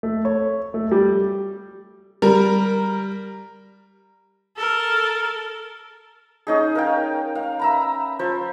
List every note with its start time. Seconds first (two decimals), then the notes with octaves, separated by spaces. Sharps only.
0.03 A3
0.25 C#5
0.74 A3
0.92 G3
2.22 G3 A#4
4.56 A4 A#4
6.47 C#4 D#4 G#4
6.75 A#4 F5 G5
7.35 F5
7.59 E5 A#5 B5
8.19 F3 C5